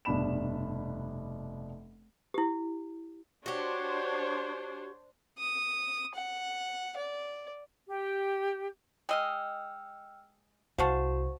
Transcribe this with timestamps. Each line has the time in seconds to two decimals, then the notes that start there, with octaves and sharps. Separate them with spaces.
0.05 F1 G2 B2 D4 B5 E7
2.34 E4 G4
3.46 D4 F#4 G4 C5 C#5
5.38 D#6
6.15 F#5
6.96 D5
7.88 G4
9.09 G#3 D#5 G5 E6 F6
10.78 C2 F#4 C5 F5 F#5 A5 C#6